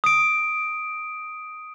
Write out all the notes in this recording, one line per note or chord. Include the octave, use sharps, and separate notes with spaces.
D#6 D7